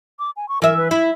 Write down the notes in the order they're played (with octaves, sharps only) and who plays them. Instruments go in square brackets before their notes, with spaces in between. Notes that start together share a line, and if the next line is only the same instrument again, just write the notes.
[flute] D6
G#5
C#6
[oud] E3 E5 [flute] A#4
[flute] B4
[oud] E4 [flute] E5